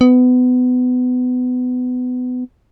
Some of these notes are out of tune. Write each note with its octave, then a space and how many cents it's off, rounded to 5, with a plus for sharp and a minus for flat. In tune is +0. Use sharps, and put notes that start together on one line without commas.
B3 +25